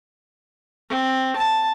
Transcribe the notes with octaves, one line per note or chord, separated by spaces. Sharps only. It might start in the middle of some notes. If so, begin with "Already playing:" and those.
C4
A5